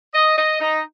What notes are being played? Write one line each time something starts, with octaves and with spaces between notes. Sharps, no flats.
D#5
D#5
D#4